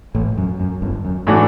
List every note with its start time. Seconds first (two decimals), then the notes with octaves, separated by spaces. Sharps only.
0.15 A1 A2
0.38 F#2
0.60 F#2
0.82 G1 G2
1.05 F#2
1.27 A2 E3 A3 D4 F#4